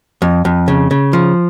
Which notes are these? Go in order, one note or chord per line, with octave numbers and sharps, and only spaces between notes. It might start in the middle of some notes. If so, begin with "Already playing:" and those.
F2
F2
C#3
C#3
F3